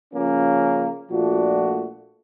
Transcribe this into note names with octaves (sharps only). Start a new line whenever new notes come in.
C#3 F3 A#3 C#4
A#2 F3 A3 D4 F#4